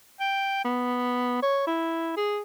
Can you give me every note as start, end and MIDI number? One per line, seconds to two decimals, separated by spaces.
0.20 0.60 79
0.65 1.39 59
1.42 1.62 73
1.67 2.13 64
2.17 2.41 68